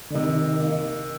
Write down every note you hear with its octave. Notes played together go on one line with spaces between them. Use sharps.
D3
C3 D#3
A#3